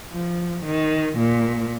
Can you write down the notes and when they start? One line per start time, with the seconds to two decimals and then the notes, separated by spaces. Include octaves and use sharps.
0.13 F3
0.65 D#3
1.18 A#2